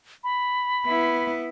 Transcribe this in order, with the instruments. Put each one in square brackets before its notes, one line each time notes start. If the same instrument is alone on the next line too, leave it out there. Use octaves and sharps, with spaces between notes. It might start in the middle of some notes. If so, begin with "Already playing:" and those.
[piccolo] B5
[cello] B3 E4